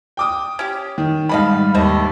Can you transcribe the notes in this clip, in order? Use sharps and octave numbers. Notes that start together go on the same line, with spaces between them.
G5 D6 D#6
C#4 G4
D#3
G#2 D3 G3 D#5 F5 B5
D#2 A3 C5 D#5